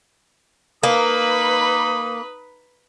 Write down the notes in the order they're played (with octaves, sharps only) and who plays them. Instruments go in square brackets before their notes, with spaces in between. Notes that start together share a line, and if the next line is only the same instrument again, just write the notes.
[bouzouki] A#3 [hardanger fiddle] D#4 B5 [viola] B4 [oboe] D#6